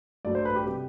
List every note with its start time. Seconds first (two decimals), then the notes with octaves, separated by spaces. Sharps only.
0.25 G2 F#3 A3 D5
0.35 C5
0.45 B4
0.55 G4
0.66 C3 G3 G4